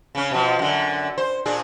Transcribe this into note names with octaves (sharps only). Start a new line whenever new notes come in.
C#3 C#4
B2 F3
F#2 D3
C5
A#2 D4 G#4